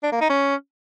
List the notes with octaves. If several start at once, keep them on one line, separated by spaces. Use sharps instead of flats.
D4
A#3
D#4
C#4